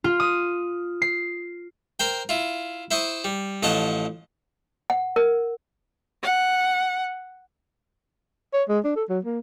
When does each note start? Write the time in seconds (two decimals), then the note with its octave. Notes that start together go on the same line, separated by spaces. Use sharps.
0.04 F4
0.20 D#6
1.02 C7
1.99 A#4 C5 G5
2.29 E4 F4
2.91 E4 C5 E5 C#6 D#6
3.24 G3
3.63 A1 F3 C#5 D#5 F#5 A5
4.90 F#5
5.16 A#4
6.23 F#5
8.54 C#5
8.69 G#3
8.84 D4
8.96 A4
9.09 F#3
9.25 A#3